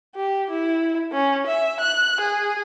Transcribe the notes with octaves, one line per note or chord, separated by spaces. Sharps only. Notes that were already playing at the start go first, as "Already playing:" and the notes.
G4
E4
C#4
E5
F#6
G#4